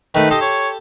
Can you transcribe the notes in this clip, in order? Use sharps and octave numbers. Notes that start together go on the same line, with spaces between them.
D#3 A3 B4
G4 A4 D#5 C6
C#5